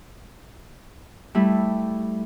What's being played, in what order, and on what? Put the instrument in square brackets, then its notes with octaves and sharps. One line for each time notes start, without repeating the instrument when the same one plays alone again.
[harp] G3 A3 E4